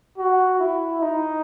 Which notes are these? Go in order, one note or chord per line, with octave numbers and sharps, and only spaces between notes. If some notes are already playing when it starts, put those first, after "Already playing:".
F#4
E4
D#4